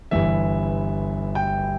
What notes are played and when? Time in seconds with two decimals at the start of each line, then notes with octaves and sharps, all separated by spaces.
0.11 G1 G2 E3 E5
1.35 G5